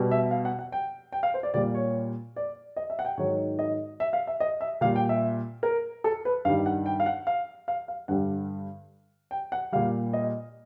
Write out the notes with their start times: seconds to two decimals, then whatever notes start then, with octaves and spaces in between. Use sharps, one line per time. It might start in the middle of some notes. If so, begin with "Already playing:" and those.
Already playing: B2 G3
0.11 E5
0.31 F5
0.45 F#5
0.59 F#5
0.72 G5
1.13 G5
1.23 F5
1.34 C5
1.43 D5
1.54 A#2 G3 D5
1.74 C#5
2.36 D5
2.76 D#5
2.90 E5
2.99 F#5
3.05 G5
3.17 G#2 D#3 F#3 C#5
3.59 D#5
4.00 E5
4.13 F5
4.27 E5
4.40 D#5
4.61 E5
4.81 A#2 G3 F5
4.96 G5
5.09 E5
5.63 A#4
6.04 A4
6.25 B4
6.45 G2 F5
6.48 D#3 G3
6.66 F#5
6.86 G5
7.00 F5
7.06 F#5
7.27 F5
7.68 F5
7.88 F5
8.08 G2 D3 G3 F#5
9.31 G5
9.52 F#5
9.72 A#2 G3 F5
10.13 D#5